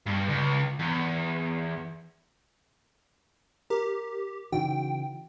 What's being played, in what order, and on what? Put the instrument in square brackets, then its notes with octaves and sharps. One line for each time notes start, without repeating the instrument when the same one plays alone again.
[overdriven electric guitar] G2
C#2
E2
[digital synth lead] G4 [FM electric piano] A#4
[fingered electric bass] C#3 E3 [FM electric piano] D#4 F#4 [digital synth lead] G5